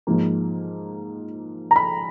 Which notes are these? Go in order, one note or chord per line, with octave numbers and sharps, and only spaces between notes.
G#2 F3 A#3
A#5
B5